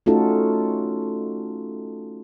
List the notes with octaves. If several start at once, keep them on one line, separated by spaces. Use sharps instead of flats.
A3 C#4 D#4 F4 F#4 A4